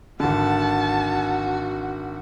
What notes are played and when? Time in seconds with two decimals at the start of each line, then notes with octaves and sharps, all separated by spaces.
0.20 G#1 D3 F#4 A5